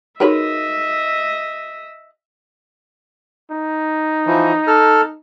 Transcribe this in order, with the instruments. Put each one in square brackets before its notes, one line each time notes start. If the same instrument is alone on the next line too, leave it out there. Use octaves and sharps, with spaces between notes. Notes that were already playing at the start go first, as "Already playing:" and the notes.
[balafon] D#4 F#4 G#4 [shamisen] A#4 B4 C#5 [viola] D#5 E5
[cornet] D#4
[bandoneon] E3 F3
A4 F6